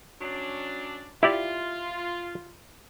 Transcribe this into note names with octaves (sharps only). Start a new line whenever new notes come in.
F#3 C#4 D4
E4 F4 G4 D5 E5